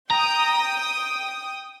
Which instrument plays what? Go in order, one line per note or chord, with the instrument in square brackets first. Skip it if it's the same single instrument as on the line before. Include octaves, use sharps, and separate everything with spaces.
[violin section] G5 D#6 [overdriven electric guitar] A#5